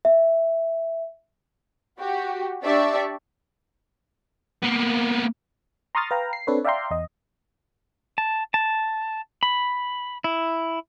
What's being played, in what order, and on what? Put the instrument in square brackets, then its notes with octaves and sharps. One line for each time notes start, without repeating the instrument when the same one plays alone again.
[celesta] E5
[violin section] F#4 G4
D4 G4 D5 E5 C#6
[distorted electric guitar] A#3 B3
[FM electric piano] A#5 C6 C#6 D#6 F6 A6
B4 F5 G5 A#5
C7
C4 D4 A4 B4 C#5
D5 E5 F5 G5 A#5 C6
E2 D#5
[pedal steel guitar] A5
A5
B5
E4